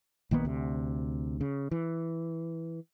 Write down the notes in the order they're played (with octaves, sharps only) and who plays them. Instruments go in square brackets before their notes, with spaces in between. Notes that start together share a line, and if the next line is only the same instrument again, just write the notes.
[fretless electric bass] A#1 D#3 A#3 B3
D2 C3
C#3
E3